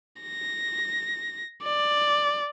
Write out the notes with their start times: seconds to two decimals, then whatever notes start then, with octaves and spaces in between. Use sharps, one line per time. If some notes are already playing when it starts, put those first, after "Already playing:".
0.23 A#6
1.63 D5